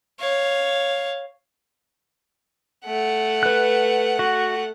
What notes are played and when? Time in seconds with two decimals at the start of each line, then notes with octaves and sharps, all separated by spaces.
0.20 C#5 F5
2.86 A3 F#5
3.43 B4 F#6
4.19 F#4